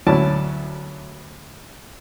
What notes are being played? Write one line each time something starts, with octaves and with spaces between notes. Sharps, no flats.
D2 F#3 C#4 E4 D5 A5